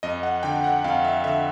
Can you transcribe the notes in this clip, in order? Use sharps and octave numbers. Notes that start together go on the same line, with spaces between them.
F2 D#5
F#5
D3 G5
F#5
F2 F5
E5
D3 E5